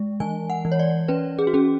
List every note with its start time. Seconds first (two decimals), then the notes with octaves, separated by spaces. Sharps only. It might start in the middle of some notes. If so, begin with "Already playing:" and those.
Already playing: G#3
0.20 E3 G#5
0.50 F#5
0.65 E3
0.72 C#5
0.79 D5
1.08 C#4 B4
1.39 G#4
1.47 F#4
1.54 C#4 G#4